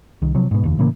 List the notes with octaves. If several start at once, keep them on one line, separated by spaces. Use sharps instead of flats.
C2 D#3
C3 F3 F#3
G#2 B2
F1 D#2
A2 C#3 E3 A#3